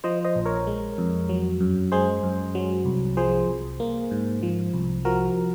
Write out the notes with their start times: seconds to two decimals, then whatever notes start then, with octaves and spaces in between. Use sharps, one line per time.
0.04 F3 C5 D#5
0.24 C5 D#5
0.35 A#1
0.46 A#4 C#5
0.67 G#3
0.98 F2
1.29 F#3
1.60 F#2
1.92 G#3 G#4 C5
2.23 F#2
2.55 F#3
2.85 C2
3.17 F3 G#4 C5
3.49 C2
3.80 A#3
4.11 G#2
4.43 F3
4.74 C2
5.05 F3 F#4 A#4